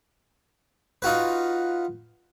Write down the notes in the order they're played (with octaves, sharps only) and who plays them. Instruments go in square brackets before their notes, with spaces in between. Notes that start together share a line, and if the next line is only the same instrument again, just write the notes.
[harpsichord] D#4 F4 F#4 B4